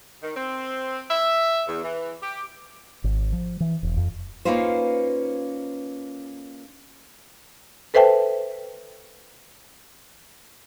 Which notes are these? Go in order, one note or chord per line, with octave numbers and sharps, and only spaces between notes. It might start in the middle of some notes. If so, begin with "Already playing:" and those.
D#3
C4
E5
E2
E3
G4
G#1
F3
E3
E1
F2
A#3 C#4 D#4 F4 B4 C5
A4 B4 C5 E5 G5 A5